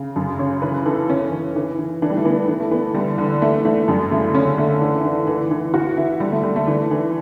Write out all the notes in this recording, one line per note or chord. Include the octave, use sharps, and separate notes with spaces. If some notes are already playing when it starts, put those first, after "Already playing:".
Already playing: C#3
F#2
C#3 C#5
E3 B4
E3 A4
E3 C#4
E3
E3
E3
E3 D4
G3
A3
E3 B3
E3
A3
E3 B3
D3 G3
D3
E3 A3
E3 A3
F#2 G3
C#3 A3
D3 C#4
D3 A3
E3
E3
E3
E3
E3 F#4
E3 E4
D3 G3
A3
D3 G3
A3
E3
E3